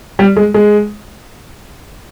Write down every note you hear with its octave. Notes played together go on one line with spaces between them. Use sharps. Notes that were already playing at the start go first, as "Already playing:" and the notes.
G3
G#3
G#3